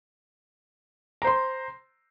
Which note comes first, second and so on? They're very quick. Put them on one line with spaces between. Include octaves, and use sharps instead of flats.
A#5 C5 C6